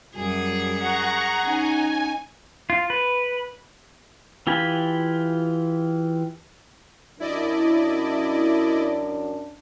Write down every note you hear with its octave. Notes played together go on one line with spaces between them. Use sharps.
F#2 G3 G#4
F#5 A#5 C#6
C#4 D#4 G#5
F4
B4
E3 F4 G4 G#5 B5
F#2 D4 E4 D5 D#5